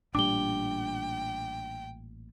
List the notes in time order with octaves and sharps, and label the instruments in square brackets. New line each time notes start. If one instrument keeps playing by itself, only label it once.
[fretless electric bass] A1 A#2 G3 [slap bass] D4 [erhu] G5 [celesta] D6 G7